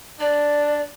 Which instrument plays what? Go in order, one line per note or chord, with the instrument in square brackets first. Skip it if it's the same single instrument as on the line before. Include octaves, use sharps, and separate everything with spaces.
[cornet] D4 [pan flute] D5